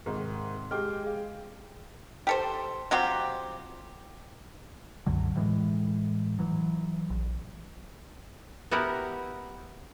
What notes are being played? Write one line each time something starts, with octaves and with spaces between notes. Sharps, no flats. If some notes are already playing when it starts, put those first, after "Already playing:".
G#2 C3 D#3
G#3 G4 G5 D6 F6
G#4 F5
G4 A4 C5
F#3 C4 F4 G4
C2 F#2 D3 F#3
A2 E3 G#3
E3 F#3
A#1
B3 E4 F#4 G4 A#4